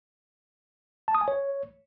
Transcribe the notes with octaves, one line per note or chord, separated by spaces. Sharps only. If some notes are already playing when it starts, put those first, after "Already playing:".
A5
D#6
G#5
C#5